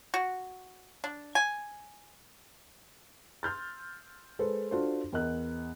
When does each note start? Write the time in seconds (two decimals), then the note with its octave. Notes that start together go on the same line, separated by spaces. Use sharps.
0.14 F#4
1.04 D4
1.35 G#5
3.43 C6 F6 G6 A6
4.39 G#3 A4 B4 C5
4.71 D4 F4 F#4 A4 C5
5.13 E2 A#4 D#5 F#6